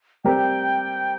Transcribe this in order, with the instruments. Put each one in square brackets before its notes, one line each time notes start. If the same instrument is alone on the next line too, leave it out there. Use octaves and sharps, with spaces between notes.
[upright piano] G3 C4 G4 A#4 [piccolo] G5